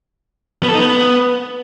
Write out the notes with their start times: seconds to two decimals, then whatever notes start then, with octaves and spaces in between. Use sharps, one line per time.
0.63 B3
0.69 A4
0.74 D#4
0.79 B3